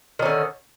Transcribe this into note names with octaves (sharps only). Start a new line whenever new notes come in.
D3 D#3 C#4